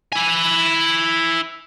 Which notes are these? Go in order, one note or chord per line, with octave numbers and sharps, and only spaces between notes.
E4 G#5